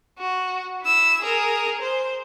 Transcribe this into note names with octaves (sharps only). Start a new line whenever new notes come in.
F#4
E4 E6
G#4 A#4
C5